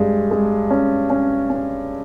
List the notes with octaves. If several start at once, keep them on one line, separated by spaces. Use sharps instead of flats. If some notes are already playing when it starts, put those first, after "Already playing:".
Already playing: G2 G#3
G#3
C#4
C#4
C#4